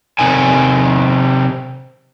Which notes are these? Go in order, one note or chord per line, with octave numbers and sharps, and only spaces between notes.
C3 D#3 G#5